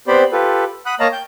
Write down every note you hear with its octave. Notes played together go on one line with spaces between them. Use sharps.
B3 C4 G4 C5 D5 B5
F4 G4 A4 B4
F#5 B5 D#6 F#6
A#3 C#5 D#5 F5 A5 A#5
G5 G6